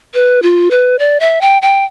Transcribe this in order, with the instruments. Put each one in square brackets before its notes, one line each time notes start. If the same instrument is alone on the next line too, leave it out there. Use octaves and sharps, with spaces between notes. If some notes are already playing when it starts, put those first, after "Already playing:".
[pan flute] B4
F4
B4
D5
E5
G5
G5